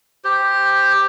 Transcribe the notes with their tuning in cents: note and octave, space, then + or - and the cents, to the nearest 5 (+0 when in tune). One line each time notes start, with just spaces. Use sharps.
G4 +5 C5 +0